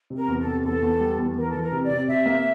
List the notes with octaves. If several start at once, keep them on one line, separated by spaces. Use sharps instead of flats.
C3
A#4
E2
A4
C3
E2 A4
E2
G3
E2
E3 A#4
A4
E3
A#4
C3
D5
C3
C3 E5
A#3